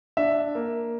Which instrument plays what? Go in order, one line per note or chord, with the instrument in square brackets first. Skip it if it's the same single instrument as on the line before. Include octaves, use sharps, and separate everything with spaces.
[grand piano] D4 E5
A#3